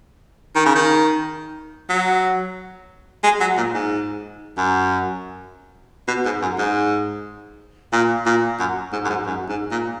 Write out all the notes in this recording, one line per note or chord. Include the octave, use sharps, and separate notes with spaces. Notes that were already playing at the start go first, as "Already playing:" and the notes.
D#3
C#3
D#3
F#3
G#3
F#3
A#2
G#2
F#2
B2
G#2
F#2
G#2
A#2
A#2
F#2
G#2
F#2
G#2
F#2
G#2
A#2